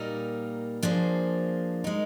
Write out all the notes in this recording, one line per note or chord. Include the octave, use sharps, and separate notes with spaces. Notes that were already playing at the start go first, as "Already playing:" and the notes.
Already playing: A#2 G3 A#3 D#4 A#4
F3 A#3 D4 G#4 C5
G#3 D#4 A#4